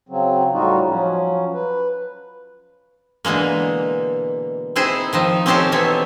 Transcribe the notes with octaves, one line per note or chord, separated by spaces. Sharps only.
C#3 F#3 C4
A2 G3 D#4 F4 F#4
F3 F#3 C#4
B4
B2 D3 E3 G#3 A#3
C4 D#4 E4 G#4 C5
D#3 F3 D#4
C4 C#4 D#4 G4 A4 C5
B2 E3 C4 C#5 E5